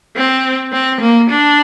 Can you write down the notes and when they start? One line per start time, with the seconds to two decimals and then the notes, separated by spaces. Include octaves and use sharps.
0.16 C4
0.72 C4
1.01 A#3
1.30 D4